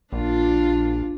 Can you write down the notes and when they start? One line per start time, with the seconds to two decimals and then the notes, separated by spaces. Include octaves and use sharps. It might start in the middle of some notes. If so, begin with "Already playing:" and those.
0.13 A#1 D4 F4